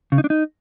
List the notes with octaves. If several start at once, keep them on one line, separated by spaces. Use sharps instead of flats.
C#3
D#4
D4
D#4